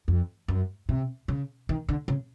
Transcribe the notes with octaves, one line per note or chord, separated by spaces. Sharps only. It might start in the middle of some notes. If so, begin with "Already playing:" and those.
F2
F#2
C3
C#3
D#3
D3
C#3